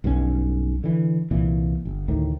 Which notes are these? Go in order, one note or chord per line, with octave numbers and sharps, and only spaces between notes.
B1 G2 F3 C#4
D3 E3
C2 A#2 E3
G1
D2 A2 D#3